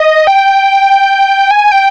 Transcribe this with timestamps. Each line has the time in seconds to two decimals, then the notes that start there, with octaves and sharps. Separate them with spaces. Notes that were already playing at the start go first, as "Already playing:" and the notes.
Already playing: D#5
0.27 G5
1.51 G#5
1.72 G5